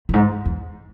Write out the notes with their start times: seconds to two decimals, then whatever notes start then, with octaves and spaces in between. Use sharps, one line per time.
0.09 F#2
0.14 G#2
0.45 E2